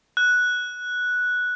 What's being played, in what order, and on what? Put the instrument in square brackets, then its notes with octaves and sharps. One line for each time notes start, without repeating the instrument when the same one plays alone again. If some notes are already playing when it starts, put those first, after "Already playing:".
[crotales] F#6